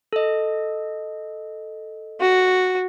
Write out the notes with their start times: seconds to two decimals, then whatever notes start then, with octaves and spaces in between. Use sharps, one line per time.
0.13 A4 D#5
2.20 F#4